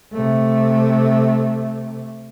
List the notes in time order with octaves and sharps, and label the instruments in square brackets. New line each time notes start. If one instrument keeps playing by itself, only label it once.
[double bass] C3 A3